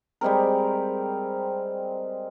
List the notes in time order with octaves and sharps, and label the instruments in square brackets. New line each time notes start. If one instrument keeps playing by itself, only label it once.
[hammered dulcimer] G3 G#3 C4 A#4